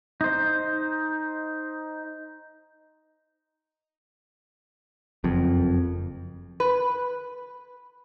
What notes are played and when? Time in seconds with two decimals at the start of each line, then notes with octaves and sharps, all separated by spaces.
0.21 D#4 C5
5.24 F#1 F2
6.60 B4